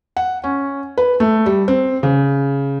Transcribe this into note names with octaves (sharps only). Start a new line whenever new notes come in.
F#5
C#4
B4
A3
G3
C4
C#3